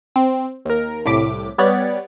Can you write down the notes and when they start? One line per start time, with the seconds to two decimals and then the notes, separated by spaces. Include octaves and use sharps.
0.16 C4
0.65 D#2 A#4
1.06 C2 A2 D6 B6
1.58 G3 B3 C#5 D5